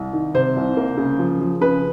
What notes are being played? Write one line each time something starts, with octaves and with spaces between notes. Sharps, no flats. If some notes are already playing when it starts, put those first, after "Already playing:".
Already playing: C2
D#3
C3 C5
C2
A#3
C#3
F3
F3
C#3 B4